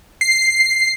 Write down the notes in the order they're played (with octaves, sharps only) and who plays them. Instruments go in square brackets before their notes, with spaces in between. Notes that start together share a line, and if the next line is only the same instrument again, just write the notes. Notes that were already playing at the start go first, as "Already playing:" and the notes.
[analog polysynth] C7